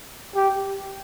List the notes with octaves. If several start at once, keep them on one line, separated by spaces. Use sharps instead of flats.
G4